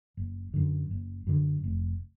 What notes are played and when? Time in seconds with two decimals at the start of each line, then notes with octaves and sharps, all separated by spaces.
0.17 F#1
0.54 F#2 D3
0.91 F#1
1.27 F#2 D3
1.64 F1